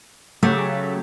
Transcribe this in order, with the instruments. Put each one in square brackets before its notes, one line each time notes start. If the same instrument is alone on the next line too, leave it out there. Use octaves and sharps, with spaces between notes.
[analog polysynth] C#3 F#3 G4 [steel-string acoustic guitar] A3